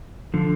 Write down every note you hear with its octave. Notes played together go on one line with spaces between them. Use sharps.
D3 F3